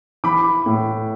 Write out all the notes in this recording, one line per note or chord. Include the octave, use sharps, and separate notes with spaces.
E3 B5 D6
A2